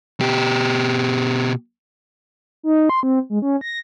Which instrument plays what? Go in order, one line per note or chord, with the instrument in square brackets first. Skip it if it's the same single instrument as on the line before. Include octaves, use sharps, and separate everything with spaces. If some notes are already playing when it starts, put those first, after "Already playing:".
[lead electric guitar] B2 G4
[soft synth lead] D#4
C6
C4
G#3
C#4
A#6